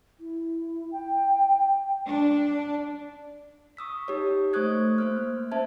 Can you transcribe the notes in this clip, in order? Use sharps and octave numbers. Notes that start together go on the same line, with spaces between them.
E4
G5
D4
C#6 D#6 E6 B6
D#4 G4 C#5
A3 C5 C#6 D#6 F#6 G#6
A#3 C5 F6
C#4 C5 E5 A5 G#6